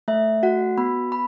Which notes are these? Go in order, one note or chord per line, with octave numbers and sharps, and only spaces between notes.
A3 E5
F#4 F#5
B3 B5
B5